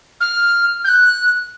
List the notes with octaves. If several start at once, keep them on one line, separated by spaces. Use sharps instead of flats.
F6
G6
F#6